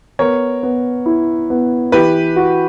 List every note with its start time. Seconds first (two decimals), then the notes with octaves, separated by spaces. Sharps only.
0.19 B3 A#4 C#5
0.63 B3
1.06 E4
1.50 B3
1.92 E3 G4 B4
2.36 F#4